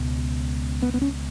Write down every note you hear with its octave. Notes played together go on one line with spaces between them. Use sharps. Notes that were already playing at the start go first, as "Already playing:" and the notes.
Already playing: C#2 B2
B3
B3
C#4